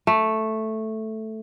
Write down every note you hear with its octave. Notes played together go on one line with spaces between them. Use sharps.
A3